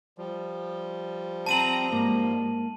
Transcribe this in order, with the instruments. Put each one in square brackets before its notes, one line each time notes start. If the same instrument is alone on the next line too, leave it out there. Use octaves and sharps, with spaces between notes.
[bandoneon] F3 G3
[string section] C4 A#5 [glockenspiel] A5 D#7 F#7
[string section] G#2 [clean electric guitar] A#3